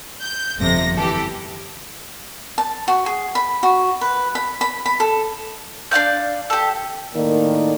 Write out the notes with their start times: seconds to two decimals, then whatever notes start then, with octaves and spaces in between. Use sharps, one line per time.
0.21 G6
0.58 G1 F2 C3 A#6
0.98 E3 G4 A4
2.58 A5
2.88 F#4
3.06 G#4
3.35 B5
3.63 F#4
4.01 B4
4.35 B5
4.61 B5
4.86 B5
5.00 A4
5.91 D4 D5 F5 G6
6.50 G4 A4
7.15 A2 D#3 A#3 D5